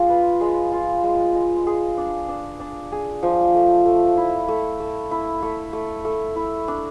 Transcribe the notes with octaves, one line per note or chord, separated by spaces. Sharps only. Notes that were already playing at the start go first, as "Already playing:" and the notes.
Already playing: G#3 D4 F4
B4
G#3
F4
G#3
G#3
G#4
D4
D4
D4
G#4
F3
A3
A3
E4
A3
A3
E4
A3
A3
A3
E4
D4